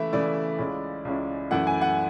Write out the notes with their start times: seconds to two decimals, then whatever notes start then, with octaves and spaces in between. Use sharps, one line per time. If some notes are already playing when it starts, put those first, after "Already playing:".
Already playing: C#3 E3 A3 E4 E5
0.13 C#3 E3 A3 E4 D5
0.58 C#2 C#3 G#3 C#4 E4
1.05 C#2 C#3 G#3 C#4 E4
1.51 F#2 E3 A3 E4 F#5
1.67 G#5
1.81 F#5